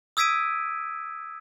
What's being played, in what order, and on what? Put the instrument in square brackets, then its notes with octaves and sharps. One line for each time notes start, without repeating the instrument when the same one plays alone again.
[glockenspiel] D#6 E6 G#6 B6 D7 D#7